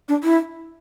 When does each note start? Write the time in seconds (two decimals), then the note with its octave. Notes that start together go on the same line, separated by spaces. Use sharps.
0.09 D4
0.23 E4